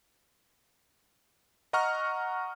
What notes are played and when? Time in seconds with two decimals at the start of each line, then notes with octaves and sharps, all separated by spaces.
1.73 D#5 F#5 A#5 C#6 F6